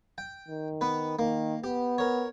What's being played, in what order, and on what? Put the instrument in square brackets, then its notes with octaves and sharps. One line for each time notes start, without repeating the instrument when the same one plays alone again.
[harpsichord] G5
[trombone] D#3
[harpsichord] B3 B4
[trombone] D#3 [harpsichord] A#3
[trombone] B3 [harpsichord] G4
[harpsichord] A#4 C#5